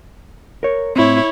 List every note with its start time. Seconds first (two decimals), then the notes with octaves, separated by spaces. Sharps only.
0.63 A#4 C#5
0.96 A2 C4 E4 C#5